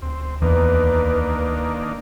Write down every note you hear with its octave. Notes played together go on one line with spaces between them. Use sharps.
D2 C4
E2 D#3 A#3 D4 B4